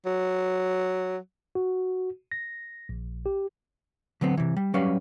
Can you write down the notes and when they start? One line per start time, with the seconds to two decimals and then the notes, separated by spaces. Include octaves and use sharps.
0.06 F#3
1.55 F#4
2.32 A#6
2.89 A#1
3.26 G4
4.21 D3 F#3 B3 C4
4.37 C3 E3
4.57 G3
4.74 F#3 G3 C#4 G4 B4 F5